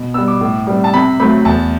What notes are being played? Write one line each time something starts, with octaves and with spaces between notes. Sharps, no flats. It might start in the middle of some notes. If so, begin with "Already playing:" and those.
Already playing: B2
G3 B3 E6
D6
A2
G3 C4
A5
C3 B5
F#3 A3 C4 B5
E2 A5